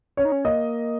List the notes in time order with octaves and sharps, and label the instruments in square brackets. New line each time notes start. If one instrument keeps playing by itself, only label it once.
[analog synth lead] C#4 [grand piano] C#5
[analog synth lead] D#4
C#4
[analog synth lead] A#3 [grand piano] D#5